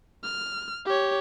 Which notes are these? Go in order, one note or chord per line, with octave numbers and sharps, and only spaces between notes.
F6
G4 C#5